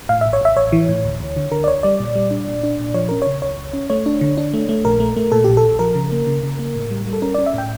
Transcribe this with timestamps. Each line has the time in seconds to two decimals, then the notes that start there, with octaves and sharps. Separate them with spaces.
0.09 A2 F5
0.21 A1 E5
0.33 C#5
0.41 A1 E5
0.57 A1 C#5
0.72 E3
0.88 A2
1.05 D2
1.20 D2
1.36 D3
1.51 D3 A#4
1.64 D5
1.67 D2 C#5
1.83 G3 D5
2.00 A#2
2.15 G3
2.31 D4
2.47 A#2
2.63 D4
2.79 A#2
2.94 F3 C#5
3.09 C#4 A#4
3.22 C#3 C#5
3.42 C#2 C#5
3.58 C#2
3.73 C#4
3.90 A3 C#5
4.06 D4
4.21 D3
4.37 D4
4.54 A3
4.69 A3
4.85 A#1 A#4
5.00 A3
5.17 A3
5.32 A#2 A4
5.44 A#1 G4
5.57 A4
5.63 A#1
5.79 F3 A#4
5.95 C#3
6.12 A#3
6.27 C#3
6.43 C#3
6.59 A#3
6.75 A2
6.91 G3
7.07 G3
7.13 A4
7.22 C#4 A#4
7.34 C#4 D5
7.46 E5
7.54 A2 G5